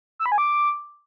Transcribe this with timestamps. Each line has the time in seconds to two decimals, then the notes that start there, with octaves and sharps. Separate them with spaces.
0.19 E6
0.26 B5
0.32 G#5
0.38 D6